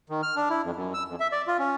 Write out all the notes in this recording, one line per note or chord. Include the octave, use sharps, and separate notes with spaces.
D#3
F6
D4
E4
F2
F#2
E6
F2
E5
D5
F4
C#4